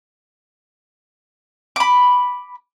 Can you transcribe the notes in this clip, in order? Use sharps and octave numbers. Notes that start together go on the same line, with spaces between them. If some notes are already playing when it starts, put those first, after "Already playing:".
B5 D6